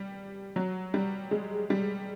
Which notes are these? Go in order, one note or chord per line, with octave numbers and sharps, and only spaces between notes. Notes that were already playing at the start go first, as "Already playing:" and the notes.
Already playing: G3
F#3
G3
G#3
G3